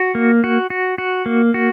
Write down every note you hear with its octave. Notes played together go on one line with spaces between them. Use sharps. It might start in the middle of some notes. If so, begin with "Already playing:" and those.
Already playing: F#4
A#3
F#4
F#4
F#4
A#3
F#4